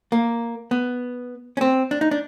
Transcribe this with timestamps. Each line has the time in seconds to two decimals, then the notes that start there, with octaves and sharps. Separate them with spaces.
0.12 A#3
0.71 B3
1.57 C#4
1.61 C4
1.91 D4
2.01 D#4
2.11 D4